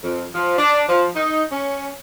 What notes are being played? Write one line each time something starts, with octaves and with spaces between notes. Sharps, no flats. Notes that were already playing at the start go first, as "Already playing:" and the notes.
F2
F3
D4
F3
D#4
C#4